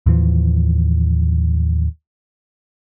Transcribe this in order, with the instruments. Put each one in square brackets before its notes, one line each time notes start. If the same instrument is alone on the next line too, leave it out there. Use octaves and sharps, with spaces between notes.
[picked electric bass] D#2 A2 E3 F3